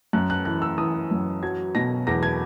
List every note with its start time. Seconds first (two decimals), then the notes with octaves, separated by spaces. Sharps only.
0.13 F#2 F#6
0.30 F#6
0.45 E3 F#6
0.62 E6
0.78 E3 D#6
1.11 F#2
1.43 F#3 G#6
1.75 B2 A#6
2.07 E2 A#6
2.23 G#6